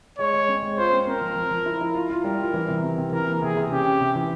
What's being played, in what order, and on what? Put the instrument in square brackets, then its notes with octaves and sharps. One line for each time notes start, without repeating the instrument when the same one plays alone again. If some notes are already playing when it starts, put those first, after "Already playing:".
[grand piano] G#3 [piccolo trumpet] C#5
[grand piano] G#3
C4
G#3
[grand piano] F4 [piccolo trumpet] C5
[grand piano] C4
[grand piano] C4 [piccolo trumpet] A#4
[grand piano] F3
F3
F3
E4
E4
F4
F4
[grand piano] G3 [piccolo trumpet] A#4
[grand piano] F4
E3
C3
C3
C3
[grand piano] E3 [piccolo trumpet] A#4
[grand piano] A#3
[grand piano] C3 [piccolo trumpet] G#4
[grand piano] C3
[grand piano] C#4 [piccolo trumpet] G4
[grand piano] C#4
C3
E3